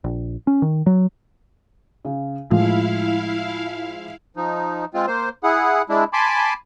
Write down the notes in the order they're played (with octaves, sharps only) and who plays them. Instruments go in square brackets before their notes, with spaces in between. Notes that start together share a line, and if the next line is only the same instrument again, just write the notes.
[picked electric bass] A#1
C#4
D#3
F#3
[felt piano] C#3
[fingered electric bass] A2 [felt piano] F3 G#3 [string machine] E4 F5
[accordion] F3 D#4
G#3 C4 F4
A#3 C5
E4 G#4 F#5
G#3 D4 E4
G#5 A5 B5 C6 D6